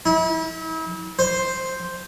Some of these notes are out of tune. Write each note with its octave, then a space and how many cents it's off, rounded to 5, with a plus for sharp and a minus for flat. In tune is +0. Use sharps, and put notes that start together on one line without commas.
E4 -40
C5 +0